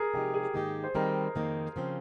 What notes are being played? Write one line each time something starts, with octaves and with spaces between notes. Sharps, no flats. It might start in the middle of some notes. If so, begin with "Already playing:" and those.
Already playing: G#4 A#4
C3 F3 G#3 D#4 G4
G#4
G#2 D#3 A#3 D#4 G4
C5
D#3 G3 C4 A#4
F2 D#3 A#3
C#3 F3 C4